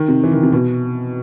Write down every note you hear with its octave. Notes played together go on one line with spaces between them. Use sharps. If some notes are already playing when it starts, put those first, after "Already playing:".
Already playing: D#3
C3
E3
D#3
C3
B2